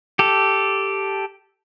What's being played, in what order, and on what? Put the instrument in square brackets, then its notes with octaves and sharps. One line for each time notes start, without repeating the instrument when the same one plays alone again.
[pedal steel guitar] G4 A4